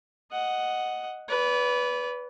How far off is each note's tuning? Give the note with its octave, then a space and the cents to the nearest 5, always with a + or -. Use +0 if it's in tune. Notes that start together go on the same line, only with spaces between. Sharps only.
D#5 +0 F#5 +0
B4 +0 D5 -40